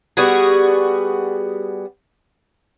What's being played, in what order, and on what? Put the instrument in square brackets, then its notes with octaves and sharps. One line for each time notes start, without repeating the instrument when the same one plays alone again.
[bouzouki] G3 B3 F#4 G#4